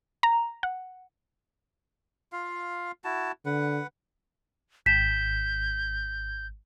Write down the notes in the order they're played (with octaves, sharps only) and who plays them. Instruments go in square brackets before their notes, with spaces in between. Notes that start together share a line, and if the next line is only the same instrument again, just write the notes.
[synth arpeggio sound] A#5
F#5
[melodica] F4 F5
E4 F#4 A5
[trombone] D3 [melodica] B4 F#5
[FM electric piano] G#1 [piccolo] G6 [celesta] B6 E7